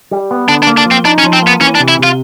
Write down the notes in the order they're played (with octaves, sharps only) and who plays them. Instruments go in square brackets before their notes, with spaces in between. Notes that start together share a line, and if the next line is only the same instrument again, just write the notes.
[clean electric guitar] G3
B3
[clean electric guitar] D3 [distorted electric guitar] D4
[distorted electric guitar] D4
[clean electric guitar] A#3
[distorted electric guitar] D4
[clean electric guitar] F3
[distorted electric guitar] C4
[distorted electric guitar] D4 [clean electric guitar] D#4
[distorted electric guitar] C#4
[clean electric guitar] F3
[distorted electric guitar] C4
[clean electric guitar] A#3 [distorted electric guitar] B3
[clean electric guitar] E3 [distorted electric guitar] C#4
[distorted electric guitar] D4
[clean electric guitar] C3
[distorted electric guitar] E4
[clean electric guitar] C3 [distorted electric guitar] F4